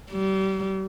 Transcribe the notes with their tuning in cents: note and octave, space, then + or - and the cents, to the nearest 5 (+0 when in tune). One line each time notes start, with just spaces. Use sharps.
G3 -35